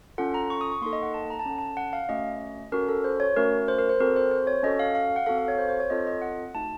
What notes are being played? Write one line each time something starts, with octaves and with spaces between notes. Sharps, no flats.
C#4 F4 A4 F#5
A#5
C#6
D#6
C#6
A#3 D#4 A4 C6
D#5
F#5
A5
A#5
A5
C#4 A4 F#5
A5
F#5
F5
A3 C#4 F#4 D#5
C#4 F#4 A4 A#4
A4
C5
C#5
A3 C#4 F#4 A#4
C5
A#4
C5
C4 F#4 A4 A#4
C5
C5
C#5
C#4 F#4 A4 D#5
F5
F5
F#5
C4 F#4 A4 F5
F5
C#5
C5
C5
C#5
C4 F4 A4 D#5
D#5
F#5
A3 D#4 F#4 A5